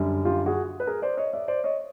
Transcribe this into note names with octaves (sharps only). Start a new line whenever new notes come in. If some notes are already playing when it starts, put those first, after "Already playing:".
Already playing: F#2 D3 G3
F4 G4
F#4 G#4
B4
G#4 A#4
C5 D5
C#5 D#5
D5 E5
C5 D5
C#5 D#5